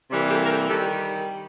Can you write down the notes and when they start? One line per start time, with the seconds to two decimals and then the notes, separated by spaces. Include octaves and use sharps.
0.10 C3 E3 G3 A#3
0.29 G4 A4
0.44 A#4
0.50 G4 A4
0.69 D#3 G3 G4 A4